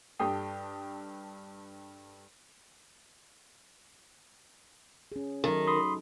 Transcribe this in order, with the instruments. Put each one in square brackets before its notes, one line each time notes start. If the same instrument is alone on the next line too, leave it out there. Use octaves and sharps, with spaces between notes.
[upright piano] G2 G4 A4 G5 D#6 C7
[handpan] C#4 G#4
[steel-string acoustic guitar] D#3 [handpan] F#3 D#4 A4
[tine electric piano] B5 C6 D#6